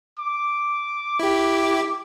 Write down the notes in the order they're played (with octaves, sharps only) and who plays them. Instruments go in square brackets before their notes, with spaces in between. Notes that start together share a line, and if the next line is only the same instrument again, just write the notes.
[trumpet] D6
[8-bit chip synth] E4 G4